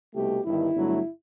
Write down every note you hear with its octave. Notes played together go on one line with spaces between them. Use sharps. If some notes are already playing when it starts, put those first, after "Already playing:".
C2 B2 A3 G4
G1 G2 D#3 E4
G1 G2 F#3 A3